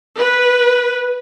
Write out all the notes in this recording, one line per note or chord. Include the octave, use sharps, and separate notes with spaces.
B4